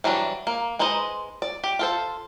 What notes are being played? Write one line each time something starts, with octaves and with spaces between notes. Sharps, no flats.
E3 F#3 G3 D4
A#3
G#3 D#4 B4 C5 D#5
D5
G4
F4 A4 C5